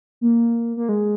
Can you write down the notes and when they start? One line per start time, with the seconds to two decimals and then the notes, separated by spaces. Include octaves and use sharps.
0.21 A#3
0.77 A#3
0.89 G#3